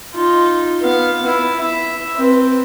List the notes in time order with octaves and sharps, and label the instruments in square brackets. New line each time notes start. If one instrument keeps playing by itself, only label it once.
[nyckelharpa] D#4 F4
B3 F5
E4
E5
C4 B4